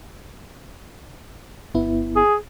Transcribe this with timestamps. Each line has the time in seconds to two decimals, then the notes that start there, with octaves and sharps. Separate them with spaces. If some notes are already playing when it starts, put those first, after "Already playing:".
1.74 G1 B3 E4
2.16 G#4